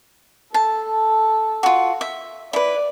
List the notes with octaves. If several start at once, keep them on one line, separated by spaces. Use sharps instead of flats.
A4 A5
F4 F#4
E5
E4 B4 D5